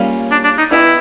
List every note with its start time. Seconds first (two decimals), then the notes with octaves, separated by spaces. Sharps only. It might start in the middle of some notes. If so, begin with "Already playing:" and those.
Already playing: G3 A#3 C#4 F4 G#4
0.31 D4
0.44 D4
0.58 D#4
0.71 B3 D#4 E4 G4 B4 D#5